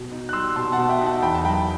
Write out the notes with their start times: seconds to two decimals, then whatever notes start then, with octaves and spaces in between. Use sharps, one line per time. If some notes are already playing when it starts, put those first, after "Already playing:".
Already playing: B2
0.12 D#4
0.29 F#6
0.33 G3 C6 E6
0.56 B2 A5 C6
0.72 F#5 A5
0.78 B2
0.89 E5 G5
1.01 D#4
1.06 F#5 A5
1.22 E2 G5 B5
1.35 A5
1.45 F#3 G5 B5